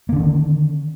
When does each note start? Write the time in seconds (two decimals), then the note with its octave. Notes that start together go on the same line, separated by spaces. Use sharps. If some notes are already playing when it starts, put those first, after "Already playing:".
0.09 A#3
0.13 D3
0.16 C#4
0.20 D#3